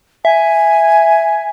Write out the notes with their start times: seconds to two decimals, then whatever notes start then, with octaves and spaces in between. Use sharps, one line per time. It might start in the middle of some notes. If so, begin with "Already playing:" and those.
0.25 E5 G#5